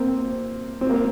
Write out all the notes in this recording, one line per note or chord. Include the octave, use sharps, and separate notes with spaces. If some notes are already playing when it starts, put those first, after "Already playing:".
Already playing: A#3 C4
C4
A#3